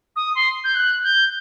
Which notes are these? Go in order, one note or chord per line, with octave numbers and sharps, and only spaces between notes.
D#6
C6
G6
F#6
G6